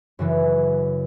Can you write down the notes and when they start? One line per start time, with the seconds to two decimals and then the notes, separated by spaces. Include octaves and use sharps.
0.19 F#2 C#3 E3